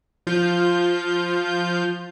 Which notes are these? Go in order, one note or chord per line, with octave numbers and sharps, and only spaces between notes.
F3 F4 G6